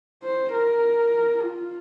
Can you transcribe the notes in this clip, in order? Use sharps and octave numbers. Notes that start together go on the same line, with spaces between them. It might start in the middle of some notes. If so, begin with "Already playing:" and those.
C5
A#4
F4